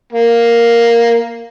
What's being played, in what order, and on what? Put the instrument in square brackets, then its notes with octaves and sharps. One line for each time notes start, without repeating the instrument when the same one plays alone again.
[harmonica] A#3